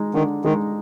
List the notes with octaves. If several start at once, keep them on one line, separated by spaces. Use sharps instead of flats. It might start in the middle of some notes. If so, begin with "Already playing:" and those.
Already playing: G#3 D#4
D3 D#3
D#3 G#3 D#4